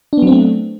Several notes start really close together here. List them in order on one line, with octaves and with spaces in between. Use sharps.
D4 B3 F#3 C4 A3